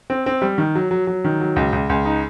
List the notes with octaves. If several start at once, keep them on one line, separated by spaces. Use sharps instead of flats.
C4
C4
G3
D#3
F#3
F#3
F#3
D#3
F#3
C#2
C#2
C#2
D#4